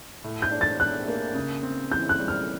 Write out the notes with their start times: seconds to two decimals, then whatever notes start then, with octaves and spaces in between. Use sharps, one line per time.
0.24 A2
0.42 G6
0.51 D4
0.61 A6
0.79 D4 F#6
1.08 A#3
1.35 C#3
1.63 C4
1.91 E3 G6
2.09 F#6
2.18 G3
2.28 F6